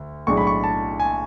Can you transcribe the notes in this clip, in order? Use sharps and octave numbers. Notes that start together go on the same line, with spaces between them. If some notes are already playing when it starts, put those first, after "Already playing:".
Already playing: D2
B1 A2 G#3 D4 C#6
B5
C#6
A5
G#5